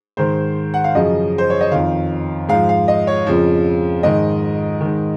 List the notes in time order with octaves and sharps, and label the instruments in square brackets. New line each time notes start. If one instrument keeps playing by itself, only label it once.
[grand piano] G#2 D#3 C5
F#5
F5
F#2 C#3 F3 D#5
C5
C#5
D#5
F2 D#3 F5
G#2 F3 F5
F5
D#5
C#5
F2 C#3 F3
G#2 D#3 D#5
G#2 D#3